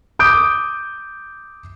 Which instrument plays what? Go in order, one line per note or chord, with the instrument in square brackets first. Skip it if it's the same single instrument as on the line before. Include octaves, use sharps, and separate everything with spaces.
[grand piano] D6 D#6 G6 D7